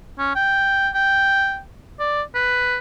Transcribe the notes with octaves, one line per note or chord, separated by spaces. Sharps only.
C#4
G5
G5
D5
B4